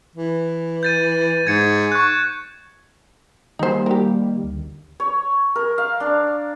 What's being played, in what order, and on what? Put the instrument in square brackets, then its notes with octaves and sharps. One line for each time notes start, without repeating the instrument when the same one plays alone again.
[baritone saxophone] E3
[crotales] G6 A6 D#7
[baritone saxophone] G#2 [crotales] G#6 C#7
[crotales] C#6 F#6
[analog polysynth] D#3 G3 A#3 [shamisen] D#4 C5
[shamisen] G4 A#4
[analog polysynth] D2
[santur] C#5
A#4
F5
D4